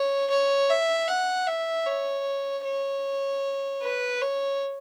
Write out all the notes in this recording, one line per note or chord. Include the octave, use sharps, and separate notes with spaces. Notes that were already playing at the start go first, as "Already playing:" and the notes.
Already playing: C#5
C#5
E5
F#5
E5
C#5
C#5
B4
C#5